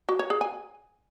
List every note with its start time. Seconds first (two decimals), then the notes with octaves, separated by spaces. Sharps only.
0.09 F#4
0.19 C#5
0.30 G#4
0.41 G#5